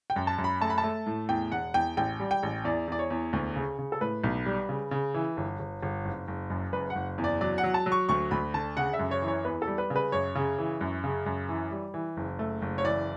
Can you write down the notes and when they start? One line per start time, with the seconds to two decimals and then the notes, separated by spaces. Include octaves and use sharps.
0.10 G5
0.16 F#2
0.27 A5
0.38 F#2
0.44 B5
0.61 A3 A5
0.70 B5
0.78 A5
0.83 A3
1.06 A2
1.29 E2 G5
1.52 E1 F#5
1.74 E2 G5
1.97 A1 G5
2.20 G3
2.31 G5
2.43 A1
2.65 E2 D5
2.88 E2 D5
2.99 C#5
3.10 E2
3.33 D2
3.56 C#3
3.79 C#3
3.92 A4
4.01 A2 B4
4.24 B1
4.46 G3
4.69 C#3
4.91 C#3
5.14 E3
5.37 G1
5.59 G1
5.82 G1
6.05 F#1
6.28 F#1
6.50 F#2
6.73 F#1 B4
6.90 F#5
6.95 F#1
7.18 E2
7.24 D5
7.41 F#3 D5
7.58 F#5
7.64 F#3
7.74 A5
7.86 F#3
7.92 C#6
8.09 D2 C#6
8.31 D2 B5
8.54 D3 A5
8.77 C#3 F#5
8.93 E5
8.99 F#2
9.11 C#5
9.22 E3
9.28 C#5
9.45 E2 B4
9.62 A4
9.67 G3
9.78 B4
9.90 C#3
9.96 B4
10.12 F#2 C#5
10.35 C#3
10.58 E3
10.81 F#2
11.04 C#3
11.26 F#2
11.49 E3
11.71 G3
11.94 E3
12.17 F#1
12.39 A3
12.62 F#1
12.78 C#5
12.84 E3 D5